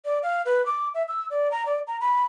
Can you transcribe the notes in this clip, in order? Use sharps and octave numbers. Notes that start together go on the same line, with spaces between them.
D5
F5
B4
D6
E5
E6
D5
A#5
D5
A#5
B5